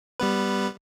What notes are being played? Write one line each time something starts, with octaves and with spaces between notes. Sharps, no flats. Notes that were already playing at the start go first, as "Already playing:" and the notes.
G3 B3 B4